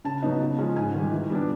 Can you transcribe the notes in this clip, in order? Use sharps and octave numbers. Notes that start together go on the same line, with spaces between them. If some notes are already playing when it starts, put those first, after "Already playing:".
C#3 A5
F#3 B3 D#4
C#3
F3 G#3 C#4
G#2 G#5
D#3 G3
E3
G3 B3 D4